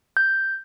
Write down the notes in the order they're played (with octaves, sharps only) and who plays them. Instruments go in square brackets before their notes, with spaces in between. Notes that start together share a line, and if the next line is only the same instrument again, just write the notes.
[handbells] G6